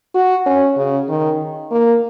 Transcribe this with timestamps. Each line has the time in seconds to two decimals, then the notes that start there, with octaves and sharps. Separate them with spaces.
0.14 F#4
0.46 C#4
0.77 C#3
1.08 D#3
1.71 A#3